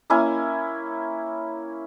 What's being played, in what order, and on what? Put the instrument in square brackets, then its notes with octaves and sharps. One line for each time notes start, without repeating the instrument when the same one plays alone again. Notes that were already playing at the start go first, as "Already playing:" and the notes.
[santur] A#3 C#4 E4 G#5